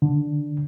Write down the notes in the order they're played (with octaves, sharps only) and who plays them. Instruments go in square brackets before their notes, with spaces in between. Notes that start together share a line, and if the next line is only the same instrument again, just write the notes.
[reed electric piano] D3